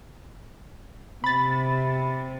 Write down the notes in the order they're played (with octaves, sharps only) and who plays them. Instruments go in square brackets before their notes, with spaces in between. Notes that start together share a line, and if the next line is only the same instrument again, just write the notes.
[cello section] C3 [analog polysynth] B5 A6